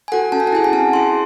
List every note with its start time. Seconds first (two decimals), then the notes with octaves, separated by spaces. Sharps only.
0.08 G#5
0.12 F#4 A4 F#5
0.32 C#4 A5
0.40 G#5
0.47 F#5
0.53 E4 G#4 G#5
0.64 G#5
0.73 C4 A5
0.93 E4 G#4 C6